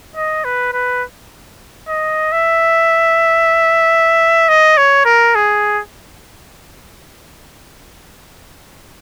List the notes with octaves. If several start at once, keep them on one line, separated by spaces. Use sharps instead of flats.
D#5
B4
B4
D#5
E5
D#5
C#5
A#4
G#4